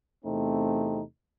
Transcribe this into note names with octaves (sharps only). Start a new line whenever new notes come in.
E2 C3 A3 C4 D#4